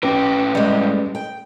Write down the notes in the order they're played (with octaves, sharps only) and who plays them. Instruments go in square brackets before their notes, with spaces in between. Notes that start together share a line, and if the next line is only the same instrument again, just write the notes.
[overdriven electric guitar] A2 G4 [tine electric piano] C#4 B4
[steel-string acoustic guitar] G3 G#3
G5